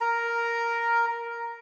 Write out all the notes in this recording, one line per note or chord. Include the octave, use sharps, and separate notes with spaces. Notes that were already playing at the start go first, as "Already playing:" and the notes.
A#4 A#5